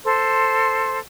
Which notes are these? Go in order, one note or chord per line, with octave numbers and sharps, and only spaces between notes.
A4 C5 C6